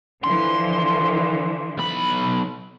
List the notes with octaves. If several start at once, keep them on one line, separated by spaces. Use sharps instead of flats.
D3 E3 F3 C6
B1 B5